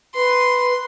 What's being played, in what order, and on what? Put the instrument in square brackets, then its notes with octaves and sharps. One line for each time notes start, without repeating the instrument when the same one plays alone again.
[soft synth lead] B4 [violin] C6